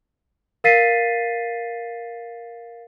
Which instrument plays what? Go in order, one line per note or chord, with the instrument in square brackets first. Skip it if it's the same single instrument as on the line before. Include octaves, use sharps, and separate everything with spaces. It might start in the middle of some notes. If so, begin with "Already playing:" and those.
[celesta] A#4 F5 A6 B6 C7 D#7